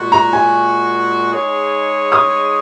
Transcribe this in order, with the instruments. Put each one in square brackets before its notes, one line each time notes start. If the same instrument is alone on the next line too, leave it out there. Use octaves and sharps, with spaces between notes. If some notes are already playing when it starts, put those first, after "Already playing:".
Already playing: [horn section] A#2 G#3 F#4
[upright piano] A#5
G#5
[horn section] G#3 D#4 G#4 C#5
[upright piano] D#6